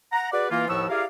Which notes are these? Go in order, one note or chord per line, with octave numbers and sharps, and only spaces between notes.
F#5 A#5
F#4 G#4 B4 D5
E3 A#3 F4
D#2 A2 F3 B3 C#6 E6
E4 G4 G#4 A#4 D5 F5